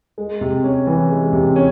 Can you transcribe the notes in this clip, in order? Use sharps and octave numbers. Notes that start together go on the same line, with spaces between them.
G#3
C3
C#4
E3
G#3
C3
C#4